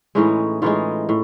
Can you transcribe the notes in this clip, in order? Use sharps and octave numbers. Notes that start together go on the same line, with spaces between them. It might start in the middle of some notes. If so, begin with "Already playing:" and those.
A2 E3 G#3 C#4 D#4
A2 E3 G#3 D#4 F4
A2